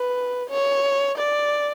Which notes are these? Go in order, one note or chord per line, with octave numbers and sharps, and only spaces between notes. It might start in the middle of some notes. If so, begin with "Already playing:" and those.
Already playing: B4
C#5
D5